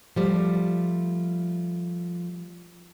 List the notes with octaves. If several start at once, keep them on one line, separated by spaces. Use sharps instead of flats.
F3 G3 A3